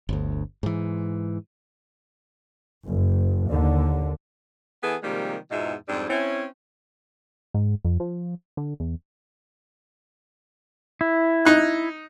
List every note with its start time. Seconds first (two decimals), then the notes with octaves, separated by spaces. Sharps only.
0.09 G1 D2
0.63 G#2 E3
2.84 F#1
3.47 D#2 D3
4.83 E3 B3 E4 G#4 A4 B4
5.03 C3 D#3 F3 G3 G#3 A#3
5.51 E2 G#2 B2 D#4 F4 E5
5.88 F2 G#2 G3 C4 D4
6.08 C4 C#4 E4
7.54 G#2
7.85 F2
8.00 F3
8.57 D3
8.80 E2
11.01 E4
11.45 D#4 F#6